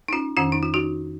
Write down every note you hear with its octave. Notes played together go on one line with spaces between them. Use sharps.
D#4
C#4 F4
F2 D#3 C#4 F4
D#4
F4
D#4 F#4